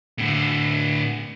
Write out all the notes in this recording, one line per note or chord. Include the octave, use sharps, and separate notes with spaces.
A2 D3